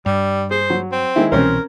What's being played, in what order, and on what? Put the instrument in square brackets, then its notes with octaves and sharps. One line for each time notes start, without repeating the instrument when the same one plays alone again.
[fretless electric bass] G2 [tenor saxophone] G3
[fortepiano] G#4 [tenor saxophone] C5
[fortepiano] F#3
[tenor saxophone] C4
[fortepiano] D#3 G#3 E4
[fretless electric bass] C2 B2 E3 [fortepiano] C4 C#4 C5 [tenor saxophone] A#4